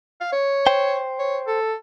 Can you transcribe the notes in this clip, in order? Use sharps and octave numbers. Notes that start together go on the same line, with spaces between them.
F5
C#5
C5 G5
C#5
A4